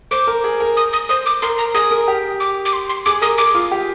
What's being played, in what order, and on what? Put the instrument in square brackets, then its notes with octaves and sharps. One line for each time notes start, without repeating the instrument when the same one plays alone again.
[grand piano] C5 [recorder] D6
[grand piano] A#4
G#4
A#4
[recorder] D#6
D#6
[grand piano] C5 [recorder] D#6
[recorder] D6
[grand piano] A#4 [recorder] C6
[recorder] A#5
[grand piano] G#4 [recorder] D#6
[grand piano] A#4
G4
[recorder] D6
D6
C6
C6
[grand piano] G#4 [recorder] D6
[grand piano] A#4 [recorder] D#6
[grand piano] G#4 [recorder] D6
[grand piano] F4
G4